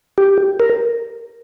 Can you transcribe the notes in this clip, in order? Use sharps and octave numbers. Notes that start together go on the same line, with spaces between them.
G4
A#4